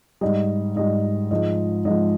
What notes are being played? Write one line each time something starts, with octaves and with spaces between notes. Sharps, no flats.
G#2 G3 D#5
G#2 G3 D#5
G#2 F3 G#3 D#5
G#2 F3 G#3 D#5